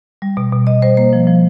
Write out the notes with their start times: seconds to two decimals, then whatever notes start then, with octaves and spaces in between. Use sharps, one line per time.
0.22 G3
0.37 B2
0.52 B2
0.67 B2 D#5
0.82 G3 C5
0.97 A#3 C5
1.13 F3
1.27 F3